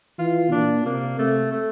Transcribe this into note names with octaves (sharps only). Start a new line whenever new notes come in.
E3 F4
A#2 D4
C3 A#3
C3 A3
A3